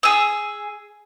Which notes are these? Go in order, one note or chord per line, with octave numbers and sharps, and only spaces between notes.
G#4 E6